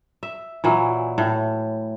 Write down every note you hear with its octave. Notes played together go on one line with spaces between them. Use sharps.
E5
A#2 E3 F#3
A2